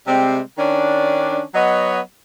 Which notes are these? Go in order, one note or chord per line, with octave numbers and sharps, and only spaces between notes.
C3 G3 G#3 C4
D#3 C#4 D4
F#3 B3 C#5 D#5